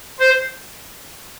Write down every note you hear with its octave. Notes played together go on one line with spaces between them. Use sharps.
C5